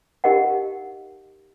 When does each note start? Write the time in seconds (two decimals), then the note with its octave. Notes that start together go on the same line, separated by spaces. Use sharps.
0.24 D#4 G4 A#4 D#5 F5 F#5